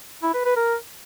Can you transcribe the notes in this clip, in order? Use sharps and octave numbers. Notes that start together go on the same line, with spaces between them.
E4
B4
B4
A#4